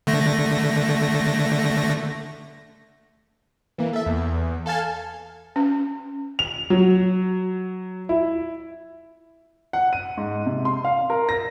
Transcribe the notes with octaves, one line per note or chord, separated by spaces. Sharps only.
D3 A3 A#6
E3 A#3
A4 E5
E2
A4 F5 G#5 A5
C#4
F7
F#3
E4
F#5
D#7
G#2
C3
C6
F5
A#4
A#6